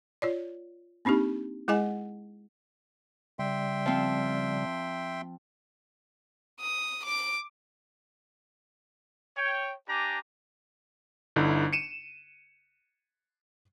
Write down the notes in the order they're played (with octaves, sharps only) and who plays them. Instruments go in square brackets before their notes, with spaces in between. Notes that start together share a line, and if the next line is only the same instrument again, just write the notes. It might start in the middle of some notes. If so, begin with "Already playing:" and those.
[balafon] F4 C#5 D5
A#3 C4 D4 D#4 G4
G#3 E4 G#4 D#5 F#5 G#5
[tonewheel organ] C#3 G3 D5 [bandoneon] E5 G5 C6
[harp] F3 C4
[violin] D#6
D6 D7
[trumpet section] C#5 G5
D4 G4 G#5 A#5
[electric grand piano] G1 D3 D#4 E4
C#7 D#7 E7